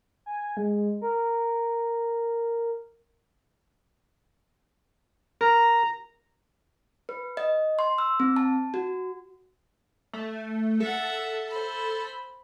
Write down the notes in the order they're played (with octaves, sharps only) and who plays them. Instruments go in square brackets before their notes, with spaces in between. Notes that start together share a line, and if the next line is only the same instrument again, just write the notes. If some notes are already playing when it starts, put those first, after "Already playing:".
[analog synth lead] G#5
G#3
A#4
[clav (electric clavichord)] A#4 [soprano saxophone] A#5
[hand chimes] B4
D#5
C6
E6
C4
A5
F#4
[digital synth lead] A3
[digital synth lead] A4 [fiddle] E5 F#5
[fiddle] C5 B5